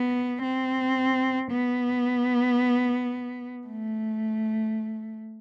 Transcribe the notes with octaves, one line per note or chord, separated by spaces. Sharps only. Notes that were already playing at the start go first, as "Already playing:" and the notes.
Already playing: B3
C4
B3
A3